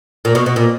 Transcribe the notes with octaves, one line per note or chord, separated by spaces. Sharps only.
A#2
B2
B2
A#2